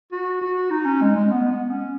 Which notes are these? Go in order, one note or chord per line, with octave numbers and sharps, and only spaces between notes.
F#4
F#4
D#4
C#4
G#3
G#3
B3
B3
C#4